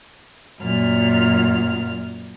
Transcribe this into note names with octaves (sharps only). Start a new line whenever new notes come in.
F#2 A#2 F6